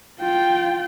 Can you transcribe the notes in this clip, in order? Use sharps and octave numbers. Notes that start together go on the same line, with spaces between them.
F4 G5